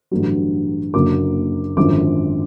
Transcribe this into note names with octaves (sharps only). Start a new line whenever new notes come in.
A1 G2 D3 F#3
F#1 F#2 D3 F#3 A#3 D6
G#1 F#2 D3 F3 D6